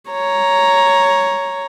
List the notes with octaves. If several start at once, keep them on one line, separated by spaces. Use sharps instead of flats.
C#5 A#5